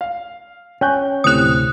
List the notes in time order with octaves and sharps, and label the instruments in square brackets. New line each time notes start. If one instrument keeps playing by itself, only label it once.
[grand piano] F5
[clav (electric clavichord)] C#4 [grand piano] G5 F#6 G6
[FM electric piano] D2 A2 C3 [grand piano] C4 F7 [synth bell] D#6 F#6